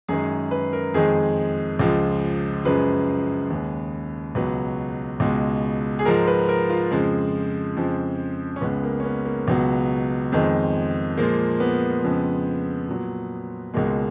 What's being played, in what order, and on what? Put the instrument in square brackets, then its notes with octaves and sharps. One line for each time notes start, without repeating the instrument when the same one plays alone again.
[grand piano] F#2 D#3 G#3 G#4
B4
A#4
F2 D#3 G#3 G#4
C#2 C#3 F3 G#3
F#2 C#3 F3 G#3 B4
D#2 C#3 G#3
C#2 B2 F#3 B4
C#2 B2 G#3
G#4
G#2 F3 G#3 A#4
B4
A#4
F4
F2 C#3 F3 G#3
F2 C#3 F3 G#3
C#4
C#2 C#3 G#3 B3
A#3
C#4
B3
A#3
C#2 B2 F#3 B3
F2 D#3 G#3
A#2 F3 G#3 A#3
B3
F2 C#3 F3 G#3
A#2 F#3
C#2 B2 G#3 A#3